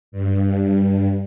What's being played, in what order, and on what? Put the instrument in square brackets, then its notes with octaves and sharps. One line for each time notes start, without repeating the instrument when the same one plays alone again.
[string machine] G2